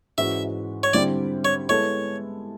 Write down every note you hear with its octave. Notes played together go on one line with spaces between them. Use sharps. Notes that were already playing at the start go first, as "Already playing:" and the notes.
G#2 E3 G#3 C#4 F#4 E5
C#5
D3 G3 C4 E4 G4 D5
C#5
G#3 B3 E4 A4 C#5